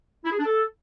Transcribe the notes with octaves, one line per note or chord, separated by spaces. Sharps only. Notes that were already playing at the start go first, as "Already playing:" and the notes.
E4
G#4
D4
A4